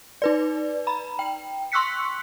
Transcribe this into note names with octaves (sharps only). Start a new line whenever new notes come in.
D#4 B4 D5
A#5 B5
G5
C6 C#6 E6 F#6 B6 C#7